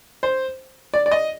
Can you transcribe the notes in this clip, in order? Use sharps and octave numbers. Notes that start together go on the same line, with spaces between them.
C5
D5
D5
D#5